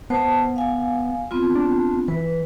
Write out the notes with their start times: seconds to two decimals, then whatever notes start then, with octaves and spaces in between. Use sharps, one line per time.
0.10 B3 C5 A5
0.56 F5 G#5
1.31 B3 C4 F4
1.55 D4
2.08 E3 B4